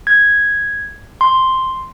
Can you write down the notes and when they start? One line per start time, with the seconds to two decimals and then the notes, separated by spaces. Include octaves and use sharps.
0.07 G#6
1.21 C6